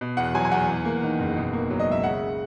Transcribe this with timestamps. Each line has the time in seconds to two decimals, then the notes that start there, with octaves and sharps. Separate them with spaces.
0.01 B2
0.17 E2 F#5
0.34 F#3 G#5
0.45 G#5
0.51 E2 F#5
0.69 E2
0.85 A#3
1.03 D#3
1.19 F#1
1.37 B2
1.53 A#3
1.70 F#3
1.80 D#5
1.87 C#2 E5
2.03 C#3 F#5